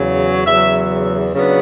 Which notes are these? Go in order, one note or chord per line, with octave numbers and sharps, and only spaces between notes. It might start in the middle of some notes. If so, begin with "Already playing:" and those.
Already playing: E2 C#3 F#3
E2 C#3 F#3 E5
C#3 F#3 B3 D4